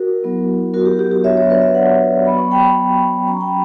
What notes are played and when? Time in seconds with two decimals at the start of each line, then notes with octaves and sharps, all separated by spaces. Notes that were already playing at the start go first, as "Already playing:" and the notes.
Already playing: F#4 A#4
0.22 F#3 B3 E4
0.74 F#4 A#4
0.85 G4
0.99 G4
1.12 G4
1.24 F#3 B3 D4 F#4 C#5 E5
1.37 C#5 E5
1.50 B4 D5
1.62 C#5 E5
1.74 D5 F#5
2.26 F#3 B3 F#4 B5
2.38 C#6
2.51 G5 B5
3.27 F#3 C#4 F#4 A#5 C#6
3.41 G5 B5